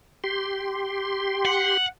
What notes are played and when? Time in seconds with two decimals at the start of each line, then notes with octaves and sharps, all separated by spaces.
0.24 G4 C6
1.45 F#5